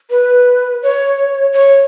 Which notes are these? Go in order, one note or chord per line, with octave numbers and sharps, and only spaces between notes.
B4
C#5
C#5